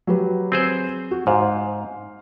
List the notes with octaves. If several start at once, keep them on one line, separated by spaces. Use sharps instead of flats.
F#3 G4 B4
C4 G#4 C5
F#4
G#2 C5 F5